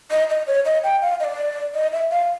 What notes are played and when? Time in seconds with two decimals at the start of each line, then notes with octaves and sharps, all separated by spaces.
0.11 D#5
0.30 D#5
0.47 C#5
0.65 D#5
0.84 G5
1.02 F5
1.20 D#5
1.24 D5
1.74 D#5
1.93 E5
2.11 F5